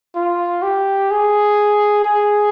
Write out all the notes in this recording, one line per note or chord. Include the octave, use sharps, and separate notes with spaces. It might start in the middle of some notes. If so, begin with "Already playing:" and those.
F4
G4
G#4
G#4